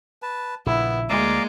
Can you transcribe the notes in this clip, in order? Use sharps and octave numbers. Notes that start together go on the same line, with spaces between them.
B4 A5
A#1 A#2 C#3 B3 E4
D2 G#3 A#3 D5 F5 A#5